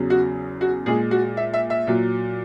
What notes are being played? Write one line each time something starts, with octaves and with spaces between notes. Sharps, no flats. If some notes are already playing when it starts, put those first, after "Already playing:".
Already playing: E2 C#3 F#3
F#4
F#4
A#2 G#3 G#4
F#4
E5
E5
E5
A#2 F#3